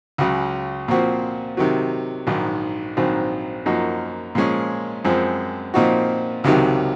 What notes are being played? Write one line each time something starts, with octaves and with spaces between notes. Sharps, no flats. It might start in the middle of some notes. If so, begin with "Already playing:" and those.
C#2 C#3 F#3
A#2 F3 C4 F#4
C3 D#3 F#3
A#1 G#2 D#3 F#3
A#1 G#2 D#3 F#3 C4
F#2 F3 A#3 D#4 F#4
A#2 F3 G#3 C#4
F#2 F3 G#3 C4
A#2 F3 C4 D#4 F#4
C#2 C3 D#3 F#3